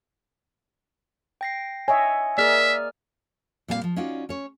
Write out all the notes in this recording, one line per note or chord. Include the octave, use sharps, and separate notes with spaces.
G5 A#6 C7
C#5 D#5 E5 G#5
A#3 G#4 A#4 D5 E5 F6
A#2 G3 A#3 C4 G4 F5
F3
C#4 D#4 F4 F#4 D5
C#4 C#5